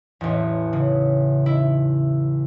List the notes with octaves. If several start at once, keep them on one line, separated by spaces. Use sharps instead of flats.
A1 E2
C#3
E4